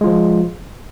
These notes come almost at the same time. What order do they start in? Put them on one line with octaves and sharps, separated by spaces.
G#3 F4 F3